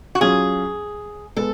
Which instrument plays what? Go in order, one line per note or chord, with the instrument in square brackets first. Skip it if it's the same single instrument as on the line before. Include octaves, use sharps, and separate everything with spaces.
[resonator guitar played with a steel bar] F#4
[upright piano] F#3 C#4 F4 [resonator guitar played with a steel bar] G#4
[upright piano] G#3 B3 [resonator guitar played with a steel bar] A4